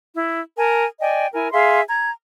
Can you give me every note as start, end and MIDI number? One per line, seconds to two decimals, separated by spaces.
0.14 0.40 64
0.57 0.83 70
0.57 0.83 80
0.57 0.83 81
1.00 1.26 74
1.00 1.26 75
1.00 1.26 79
1.00 1.26 80
1.33 1.51 64
1.33 1.51 70
1.33 1.51 80
1.52 1.81 68
1.52 1.81 76
1.52 1.81 77
1.52 1.81 84
1.88 2.11 82
1.88 2.11 92